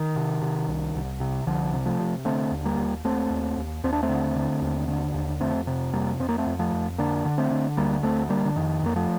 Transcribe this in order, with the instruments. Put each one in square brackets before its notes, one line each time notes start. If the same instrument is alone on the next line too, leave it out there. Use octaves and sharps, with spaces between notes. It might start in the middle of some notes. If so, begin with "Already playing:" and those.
Already playing: [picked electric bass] D#3
C3
C3
C2
C2
C3
C2 D3 F3
C3
F3 A3
C3
D3 A3 C4
D#2
G3 A#3
D#2
D#2 A3 C4
D#2
D#2
D#2 C4
D4
A3 C4
D3
D3
D#2
D3
D#2
F2 A3 C4
C3
F2 G3 A#3
F2 C4
A#3
A3 C4
F2
F3 A3
F2
D3 A#3 D4
D3
A3 C4
D3
D2 G3 A#3
D2 A3 C4
D3 G3 A#3
D3
F2 D#3
F2 A#3
F3 A3